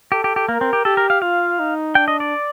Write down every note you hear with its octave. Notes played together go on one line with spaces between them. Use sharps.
G4 A4
G4
G4
A#3 A#4
C4
G4
G4 A4
A#4
F5
F4 F5
D#4
D4 G5
D#5
D5